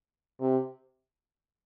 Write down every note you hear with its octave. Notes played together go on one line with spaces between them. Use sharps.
C3